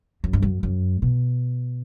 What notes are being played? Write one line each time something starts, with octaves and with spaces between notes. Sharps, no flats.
F#2
G2
F#2
F#2
B2